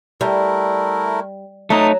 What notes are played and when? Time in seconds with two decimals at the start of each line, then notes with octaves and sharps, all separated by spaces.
0.21 G3 A3 E4 A#4
1.70 F#3 A3 D#4 A5 D#6